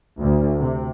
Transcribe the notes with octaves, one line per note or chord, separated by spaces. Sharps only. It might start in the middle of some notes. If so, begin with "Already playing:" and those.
D2
C3